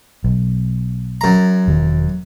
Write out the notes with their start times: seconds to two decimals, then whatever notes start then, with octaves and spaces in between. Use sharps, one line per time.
0.24 B1
1.21 F#2 A#5
1.68 E1 D#3 F#3